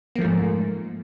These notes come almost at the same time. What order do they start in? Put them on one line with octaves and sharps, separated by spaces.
A#3 F3 A3 G#2